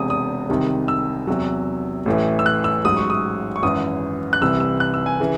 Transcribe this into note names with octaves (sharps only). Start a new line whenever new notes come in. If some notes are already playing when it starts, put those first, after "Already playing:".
Already playing: E1 E2 C3 D#6
D#6
C2 C3 D#3
E6
E2 C3 F#3
A1 A2 E3
E6
F#6
E6
A1 G#2 F#3 D#6
C#6
D#6
C#6
G#1 F#2 E3 D#6
F#6
C2 C3 E3 E6
E6
F#6
E6
G#5
C#3 E3